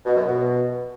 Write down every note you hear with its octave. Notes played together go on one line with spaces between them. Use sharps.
B2
F#2
B2